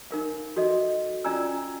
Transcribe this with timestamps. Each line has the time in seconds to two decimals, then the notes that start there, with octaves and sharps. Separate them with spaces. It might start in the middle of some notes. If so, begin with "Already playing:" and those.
0.11 D#4 A#4 F5
0.56 F#4 A4 D#5 E5
1.24 C#4 F4 D5 G#5 A#5 E6